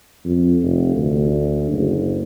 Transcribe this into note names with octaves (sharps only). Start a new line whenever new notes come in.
F2
F1
D2
F#1